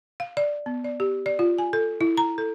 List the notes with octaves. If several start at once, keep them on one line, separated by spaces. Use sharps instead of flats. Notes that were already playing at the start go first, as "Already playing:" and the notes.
F5
D5
B3
D5
G4
D5
F4
G#5
A4
E4
A#5
A4